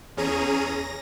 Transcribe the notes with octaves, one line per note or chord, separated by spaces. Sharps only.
E2 C#4 G#4 A#5 D#7
A#6